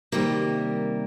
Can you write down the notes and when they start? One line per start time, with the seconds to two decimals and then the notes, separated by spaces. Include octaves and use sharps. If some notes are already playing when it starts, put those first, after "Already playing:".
0.12 C3 D#3 G3 A#3